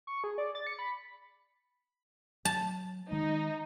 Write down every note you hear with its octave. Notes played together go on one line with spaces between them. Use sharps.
C#6
G#4
D5
A6
C#7
B5
F#3 A5
D#3 G#3 D#4